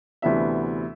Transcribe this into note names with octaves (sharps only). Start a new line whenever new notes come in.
D2 C3 E3 B3 D4 E5